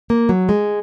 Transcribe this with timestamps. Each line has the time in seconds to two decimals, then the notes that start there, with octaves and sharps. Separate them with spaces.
0.10 A#3
0.29 F#3
0.49 G#3